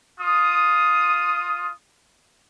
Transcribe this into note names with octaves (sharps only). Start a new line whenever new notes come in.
F4 D#6